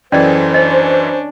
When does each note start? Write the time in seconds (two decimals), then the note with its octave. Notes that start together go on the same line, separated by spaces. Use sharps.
0.12 F#2 E3 C#4 G#4 A4 C5 D5 D#5
0.54 C#4 D4 D#5